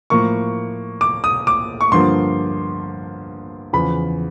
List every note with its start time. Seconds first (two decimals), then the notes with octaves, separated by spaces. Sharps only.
0.10 A2 F3 A#3 C#6
1.01 D6
1.24 D#6
1.47 D6
1.81 C#6
1.92 G2 D3 F3 A#3 C6
3.73 E2 C#3 F3 B5